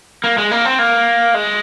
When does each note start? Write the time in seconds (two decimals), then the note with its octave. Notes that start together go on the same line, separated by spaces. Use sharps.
0.24 A#3
0.38 G#3
0.51 A#3
0.65 C4
0.79 A#3
1.34 G#3